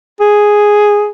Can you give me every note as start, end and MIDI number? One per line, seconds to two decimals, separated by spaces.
0.20 1.08 68